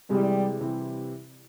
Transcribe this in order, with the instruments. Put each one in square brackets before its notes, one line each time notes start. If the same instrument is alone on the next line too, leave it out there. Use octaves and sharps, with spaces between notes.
[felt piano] C3 E3 G#3 [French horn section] G3
[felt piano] C3 E3 G3 C4